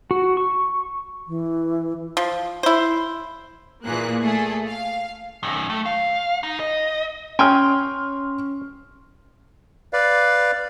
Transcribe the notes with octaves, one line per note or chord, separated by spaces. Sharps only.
F#4
C#6
E3
F3
E4 C5
A#2 E3 A#3 G#4 F#6
A3 G#4 A4
F5
F#2 D#3
A3
F5
D#4
D#5
C#4 G5 G#5 C6 F6
B4 D5 F5